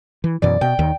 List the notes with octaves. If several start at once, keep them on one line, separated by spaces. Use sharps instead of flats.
E3
F#2 B2 E3 D5
B2 G5
D#2 D#3